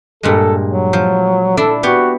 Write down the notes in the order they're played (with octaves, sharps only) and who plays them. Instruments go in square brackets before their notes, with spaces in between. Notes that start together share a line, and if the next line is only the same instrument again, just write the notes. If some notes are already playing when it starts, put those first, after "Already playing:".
[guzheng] G2 A#2 G#3 [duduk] A4
[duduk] F#3
[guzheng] F3
[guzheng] D4 E4 D5 [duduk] A4
[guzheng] B3 G4 [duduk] F#4